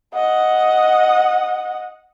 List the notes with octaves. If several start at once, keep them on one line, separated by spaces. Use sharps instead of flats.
D#5 F#5